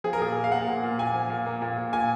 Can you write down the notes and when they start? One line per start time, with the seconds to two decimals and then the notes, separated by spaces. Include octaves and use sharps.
0.04 F3 G#4
0.13 A#4
0.20 A#2 G#4
0.35 A#3
0.44 F5
0.52 A#3 F#5
0.67 A#2
0.83 A#2
0.99 A#2 G#5
1.14 F3
1.30 A#2
1.46 A#3
1.62 A#2
1.78 A#2
1.93 A#2 G#5